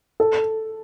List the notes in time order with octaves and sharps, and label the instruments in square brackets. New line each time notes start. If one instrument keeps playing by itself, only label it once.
[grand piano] A4